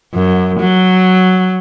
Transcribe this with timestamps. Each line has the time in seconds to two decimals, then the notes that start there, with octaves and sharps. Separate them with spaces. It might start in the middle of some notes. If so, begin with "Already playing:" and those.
0.14 F#2
0.60 F#3